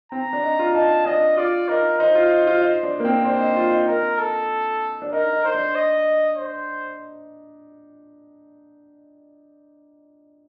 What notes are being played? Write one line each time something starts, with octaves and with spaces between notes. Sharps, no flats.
C4 A#5
D4
D#4
F4
D#4 A5
D4 D#5
F4 D5
D#4 A#4
D#4 C5
F4
D#4
F4
D#4
D4
A#3
C4
D4 C5
D#4
F4
D#4
D#4 A#4
A4
D4
D#4 A#4
D#4
C5
D4
D#5
C5